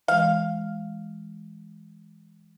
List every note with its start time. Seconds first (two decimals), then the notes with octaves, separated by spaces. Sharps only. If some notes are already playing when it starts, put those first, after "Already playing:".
0.08 E3 G#3 F5